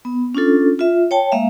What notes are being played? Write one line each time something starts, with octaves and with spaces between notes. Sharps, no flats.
B3
C#4 D4 F4 A4
F4 E5
C#5 G5 A5
G#3 A#3 E5 F5